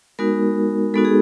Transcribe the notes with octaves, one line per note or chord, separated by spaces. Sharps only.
G#3 B3 D#4 F#4 A#4
G#3 B3 D#4 F#4 A4
G#4